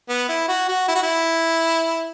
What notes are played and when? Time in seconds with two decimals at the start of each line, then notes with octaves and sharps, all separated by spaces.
0.09 B3
0.29 E4
0.48 F#4
0.68 F#4
0.88 E4
0.95 F#4
1.03 E4